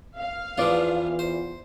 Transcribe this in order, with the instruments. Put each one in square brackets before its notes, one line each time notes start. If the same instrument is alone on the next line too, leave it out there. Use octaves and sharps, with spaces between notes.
[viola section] F5
[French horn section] E2 [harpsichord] F3 B3 [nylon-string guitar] F4 D5
[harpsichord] C5